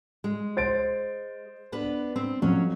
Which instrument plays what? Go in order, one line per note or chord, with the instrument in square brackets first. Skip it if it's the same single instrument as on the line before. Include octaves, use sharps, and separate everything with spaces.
[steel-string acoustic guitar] G#3
[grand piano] C5 A6 D7
[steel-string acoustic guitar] B3 D4 B4
C4
[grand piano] F2 [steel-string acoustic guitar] F#3 C#4